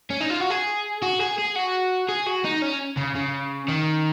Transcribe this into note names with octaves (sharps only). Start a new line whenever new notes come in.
C#4
D#4
F4
F#4
G#4
F#4
G#4
G#4
F#4
G#4
F#4
D#4
C#4
C#3
C#3
D#3